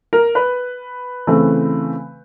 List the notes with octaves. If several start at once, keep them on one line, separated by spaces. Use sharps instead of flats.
A#4
B4
C#3 E3 A3 C4